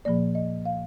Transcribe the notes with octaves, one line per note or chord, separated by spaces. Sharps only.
A#2 F3 A#3 D5
D#5
F5